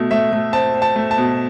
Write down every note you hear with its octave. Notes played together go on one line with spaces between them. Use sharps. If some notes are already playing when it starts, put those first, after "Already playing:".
Already playing: B2 A3
A3 E5
A3
C4 A5
C4
A5
A3
A5
B2